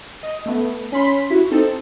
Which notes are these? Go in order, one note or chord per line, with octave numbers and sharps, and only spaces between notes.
D#5
A3 B3
C#4 B5 C6 B6
E4 F#4
C4 D#4 A4